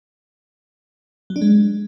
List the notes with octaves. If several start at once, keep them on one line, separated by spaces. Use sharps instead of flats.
F#3
D4
G#3